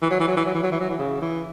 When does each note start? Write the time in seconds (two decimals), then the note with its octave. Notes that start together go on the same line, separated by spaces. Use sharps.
0.01 E3
0.10 F#3
0.19 E3
0.28 F#3
0.36 E3
0.45 F#3
0.55 E3
0.63 F#3
0.71 E3
0.80 F#3
0.89 E3
0.98 C#3
1.22 E3